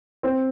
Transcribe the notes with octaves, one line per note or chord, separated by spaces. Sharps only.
C4